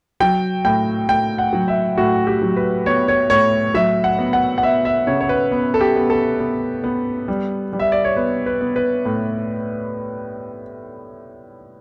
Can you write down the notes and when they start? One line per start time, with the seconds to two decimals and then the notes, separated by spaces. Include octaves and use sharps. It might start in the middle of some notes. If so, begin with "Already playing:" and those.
0.20 F#3 G5
0.65 A2 G5
1.09 A2 G5
1.38 F#5
1.53 F#3
1.68 E5
1.98 A2 F#4
2.27 G4
2.42 F#3
2.56 B4
2.86 B3 C#5
3.08 C#5
3.30 A2 C#5
3.74 F#3 E5
4.04 F#5
4.19 B3
4.33 F#5
4.58 F#5
4.63 B3 E5
4.85 E5
5.07 C#3 C#5
5.21 C#5
5.29 B4
5.51 B3
5.74 A4
5.81 G4
5.96 B3
6.10 A4
6.39 B3
6.84 B3
7.28 G3
7.73 G3
7.79 E5
7.92 D5
8.04 C#5
8.16 B3 B4
8.46 B4
8.61 B3
8.76 B4
9.05 A2